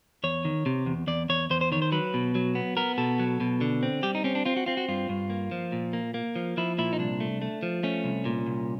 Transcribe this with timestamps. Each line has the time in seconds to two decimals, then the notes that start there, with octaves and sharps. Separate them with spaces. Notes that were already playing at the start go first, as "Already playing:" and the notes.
0.24 E2 C#5
0.45 D#3
0.66 C3
0.86 E2
1.07 E2 D5
1.29 E2 C#5
1.50 E2 C5
1.61 C5
1.72 D#3 C#5
1.82 C5
1.92 F#3 B4
2.14 B2
2.35 F#3
2.55 B3
2.77 B3 A#4
2.98 B2 A4
3.19 F#3
3.40 B2
3.61 D3
3.83 C4
4.03 G3 G4
4.15 D#4
4.24 C4 C#4
4.35 D4
4.45 C4 F4
4.56 F#4
4.66 C4 F4
4.77 F#4
4.89 G2 F4
5.09 G2
5.30 A#3
5.51 F3
5.72 A#2
5.93 A#3
6.14 A#3
6.36 F3
6.57 F3 E4
6.78 A#2 E4
6.93 D#4
6.99 C2 D4
7.20 A3
7.42 A3
7.63 F3
7.83 A3 C#4
8.04 C2
8.25 A#2
8.46 C2